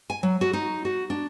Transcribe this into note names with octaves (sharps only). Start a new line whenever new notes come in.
G#5
F#3
F#4
D#4
F#4
D4